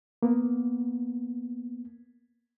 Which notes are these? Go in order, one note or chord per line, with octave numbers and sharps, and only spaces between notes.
A#3 B3